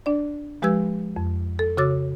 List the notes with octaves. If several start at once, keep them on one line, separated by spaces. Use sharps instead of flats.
D4 D5
F3 G#3 G4 B4 E6 G#6
F2
A4
C#3 F#4 C#5 D6 E6 A6